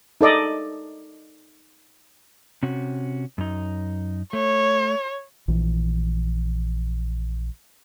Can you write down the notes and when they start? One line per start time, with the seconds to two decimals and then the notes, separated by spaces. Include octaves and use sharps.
0.21 D#4 A4 D5 D#5
2.63 C3 C#4 F#4
3.38 F#2 D#4
4.33 A3 C#5
5.48 A#1 E3